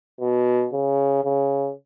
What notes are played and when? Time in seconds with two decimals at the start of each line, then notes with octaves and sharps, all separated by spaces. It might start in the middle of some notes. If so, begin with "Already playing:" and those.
0.21 B2
0.73 C#3
1.24 C#3